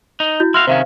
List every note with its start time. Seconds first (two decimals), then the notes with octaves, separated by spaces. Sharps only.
0.20 D#4
0.40 E4 F#4 G6
0.54 E4 F#4 F5 C6 F6
0.67 C3 D#3 C#4 C5 E5 F5